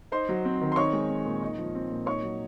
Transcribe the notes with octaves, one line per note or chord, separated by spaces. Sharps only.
D#4 C5 C6
F#3
C4
D#3
C6
D#4 C#5 C#6
G#3
C4
A#2
D#4
F3
C4
A#2
D#4 C#5 C#6
F#3